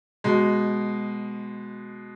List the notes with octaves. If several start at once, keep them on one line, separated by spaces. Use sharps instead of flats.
B2 G#3